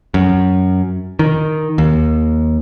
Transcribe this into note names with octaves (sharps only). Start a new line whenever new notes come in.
F#2
D#3
D#2